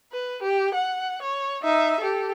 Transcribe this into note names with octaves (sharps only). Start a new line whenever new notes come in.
B4
G4
F#5
C#5
D#4 E5
G4 A4